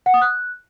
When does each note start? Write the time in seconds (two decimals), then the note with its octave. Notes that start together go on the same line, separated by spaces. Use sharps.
0.06 F#5
0.14 D#6
0.22 F#6